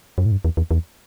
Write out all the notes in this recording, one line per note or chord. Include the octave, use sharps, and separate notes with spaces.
F#2
A2
G2
E2
E2
E2